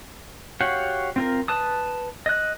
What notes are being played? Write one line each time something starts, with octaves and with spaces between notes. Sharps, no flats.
F#4 G4 C#5 F5 F#5
C4 F4 A#4
B4 A5 D#6
D#5 F#6